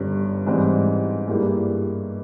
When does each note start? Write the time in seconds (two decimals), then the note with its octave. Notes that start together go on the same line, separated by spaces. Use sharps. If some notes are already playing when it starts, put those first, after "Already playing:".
Already playing: G1 G2 G3 C#4
0.47 G#2 E3 G3 C4 E4
1.28 G2 G3 A#3 E4 G#4